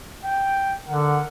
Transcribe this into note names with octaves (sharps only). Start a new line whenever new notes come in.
G5
D3 A#4 F#5